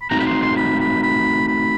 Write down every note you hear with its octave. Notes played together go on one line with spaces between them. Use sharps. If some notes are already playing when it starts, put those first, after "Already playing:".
B5
A3 C4 D#4 F#4 A#5
B5
C6
C6
B5
B5
B5
B5